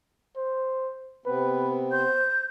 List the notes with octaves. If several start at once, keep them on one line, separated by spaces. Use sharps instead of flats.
C5
C3 B3 C4 B4
C5 G6